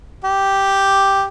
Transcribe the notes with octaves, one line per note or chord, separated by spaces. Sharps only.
G4